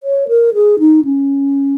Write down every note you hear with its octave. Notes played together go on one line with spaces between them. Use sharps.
C#5
A#4
G#4
D#4
C#4